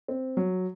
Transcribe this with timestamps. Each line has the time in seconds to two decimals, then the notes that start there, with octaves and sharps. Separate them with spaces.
0.08 C4
0.37 F#3